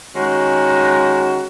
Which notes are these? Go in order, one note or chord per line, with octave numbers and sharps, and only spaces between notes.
D#3 G#3 C#4 F#4